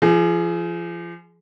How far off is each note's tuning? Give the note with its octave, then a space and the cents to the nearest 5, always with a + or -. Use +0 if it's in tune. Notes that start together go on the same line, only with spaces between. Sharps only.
F3 -30 G#4 +20